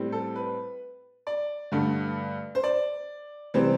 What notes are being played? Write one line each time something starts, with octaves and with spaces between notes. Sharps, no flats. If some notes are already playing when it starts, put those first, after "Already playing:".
Already playing: A2 G3 C4
A4
B4
D5
G2 D3 A3
C5
D5
C3 E3 G3 C4 C5